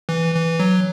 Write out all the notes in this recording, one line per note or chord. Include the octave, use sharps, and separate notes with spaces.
E3
E3
F#3